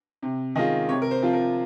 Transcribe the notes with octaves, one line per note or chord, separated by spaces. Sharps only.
C3
D#3 G#3 C#4 F4 D#5
C3 C#5
A#4
C5
F3 C4 F4
A#4